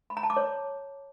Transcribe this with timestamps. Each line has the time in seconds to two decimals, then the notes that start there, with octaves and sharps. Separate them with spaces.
0.10 B5
0.17 A#5
0.23 A5
0.30 D6
0.37 C#5